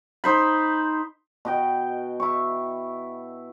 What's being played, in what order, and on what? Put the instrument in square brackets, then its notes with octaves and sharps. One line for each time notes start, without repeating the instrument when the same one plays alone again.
[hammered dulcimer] D#4 C5 B5
B2 D#5 G5
E4 C#6